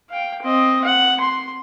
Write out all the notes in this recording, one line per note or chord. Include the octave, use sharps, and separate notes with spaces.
F5 G5
C4 D#5
F#5
C6